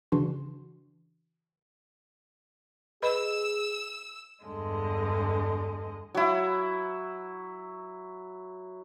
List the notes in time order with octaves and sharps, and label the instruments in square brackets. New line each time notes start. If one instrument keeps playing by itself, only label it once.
[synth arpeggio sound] C#3 E3 D4 F#4 C6
[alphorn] G#4 [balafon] B4 D#5 B5 [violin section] E6
[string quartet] E2 G2 D3 G#3 D#5
[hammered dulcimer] F#3 E4